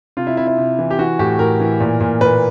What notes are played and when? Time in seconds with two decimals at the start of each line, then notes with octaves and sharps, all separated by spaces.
0.17 C3 F4
0.27 E4
0.37 C3 E4
0.47 E4
0.58 C3
0.79 E3
0.91 G4
0.99 E3 F#4
1.19 A2 G4
1.39 A2 A#4
1.60 E3
1.80 A#2
2.01 A#2
2.21 A#2 B4